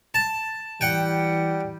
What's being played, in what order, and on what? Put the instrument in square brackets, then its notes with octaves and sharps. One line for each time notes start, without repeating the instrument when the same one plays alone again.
[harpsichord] A5
[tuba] E3 [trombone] G3 [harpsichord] F#5 G5